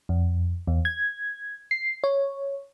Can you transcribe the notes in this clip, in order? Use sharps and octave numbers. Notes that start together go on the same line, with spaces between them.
F2
E2
G#6
C7
C#5